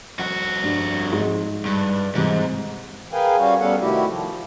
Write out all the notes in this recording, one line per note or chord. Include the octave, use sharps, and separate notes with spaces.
F2 F#4
G2
G#2
G2
G#2 C3 E3
G#4 A#4 B4 F5 G5 G#5
G3 C#4 F#4 C#5 F5
G3 B3 C#4 A4 F5 F#5
C3 D#3 A3 E4 F#4 G4
F3